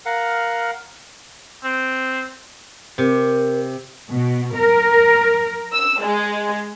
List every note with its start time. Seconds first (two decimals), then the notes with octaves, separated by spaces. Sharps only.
0.06 A#4 F5 F#5
1.64 C4
2.98 C3 A#4
4.11 B2
4.55 A#4
5.73 E6
6.02 G#3